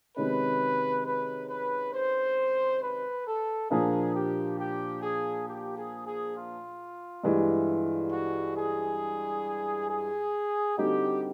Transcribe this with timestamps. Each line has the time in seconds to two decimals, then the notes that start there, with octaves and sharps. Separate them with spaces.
0.17 C3 D#3 G#3 C#4 B4
1.05 B4
1.49 B4
1.93 C5
2.82 B4
3.26 A4
3.70 A#2 F3 A#3 D4 G#4
4.14 G4
4.59 G4
5.02 G#4
5.47 G4
5.77 G#4
6.06 G#4
6.36 F4
7.24 G2 E3 G#3
8.12 F#4
8.56 G#4
9.89 G#4
10.77 D3 G3 C4 D#4 F#4 G4